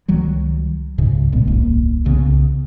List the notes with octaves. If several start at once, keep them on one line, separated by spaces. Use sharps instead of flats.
C#2 D#3 F#3 G3
C#2 G#2 C#3
A#1 A#2 G#3 B3
D#1 C2 G#2 A#3
C2 C#3 A3 B3